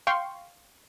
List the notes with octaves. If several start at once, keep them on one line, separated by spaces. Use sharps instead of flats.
F5 G5 C6 C#6